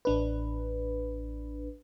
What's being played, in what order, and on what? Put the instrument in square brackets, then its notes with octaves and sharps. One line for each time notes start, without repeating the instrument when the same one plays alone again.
[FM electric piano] A1 D4 B4